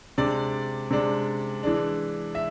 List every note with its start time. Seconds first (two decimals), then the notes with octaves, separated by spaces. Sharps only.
0.18 C3 G#3 D4 D5
0.91 C3 G#3 D4
1.63 E3 G#3 D4
2.35 E5